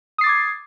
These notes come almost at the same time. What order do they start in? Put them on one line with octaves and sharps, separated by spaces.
D#6 C7 A6 D6 G#6